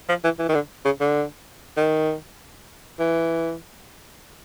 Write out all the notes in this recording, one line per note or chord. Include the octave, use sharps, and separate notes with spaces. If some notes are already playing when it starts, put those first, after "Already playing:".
F3
E3
E3
D#3
D3
C#3
D3
D#3
E3